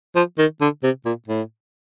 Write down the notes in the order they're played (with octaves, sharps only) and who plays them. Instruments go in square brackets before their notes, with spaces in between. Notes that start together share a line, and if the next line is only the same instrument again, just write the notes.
[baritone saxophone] F3
D#3
D3
C3
A#2
A2